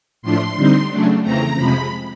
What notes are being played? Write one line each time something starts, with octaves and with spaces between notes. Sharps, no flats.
A2 F3 A3 D4 C6
D3 G3 C4 D#4
C#3 F#3 A3 D4
F2 C#3 E3 A3 C4 A#5
F2 C3 F3 G#3 B5